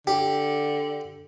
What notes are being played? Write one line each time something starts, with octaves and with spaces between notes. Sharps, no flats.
D3 G4